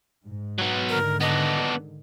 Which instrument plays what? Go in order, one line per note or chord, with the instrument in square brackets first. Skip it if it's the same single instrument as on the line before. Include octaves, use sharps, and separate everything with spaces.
[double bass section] G#2
[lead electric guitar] F#3 B3
[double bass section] G#2 D3 D#3 [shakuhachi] A#4
[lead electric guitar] B3 D4 [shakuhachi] D#5